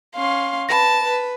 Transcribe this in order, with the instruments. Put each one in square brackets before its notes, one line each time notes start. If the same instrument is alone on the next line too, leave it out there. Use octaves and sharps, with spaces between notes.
[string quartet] C#4 F5 C6
[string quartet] B4 [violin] A5 [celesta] B5 A#6
[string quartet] B4